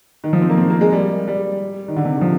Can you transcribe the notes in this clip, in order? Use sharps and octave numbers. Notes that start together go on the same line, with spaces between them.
D#3
F3
C4
A#3
C4
A#3
G#3
G3
G3
D#3
D3
C3
D#3
F3